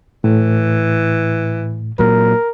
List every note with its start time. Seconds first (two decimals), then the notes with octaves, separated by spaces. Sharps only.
0.24 A2 E3
1.99 A#2 F#3 A#4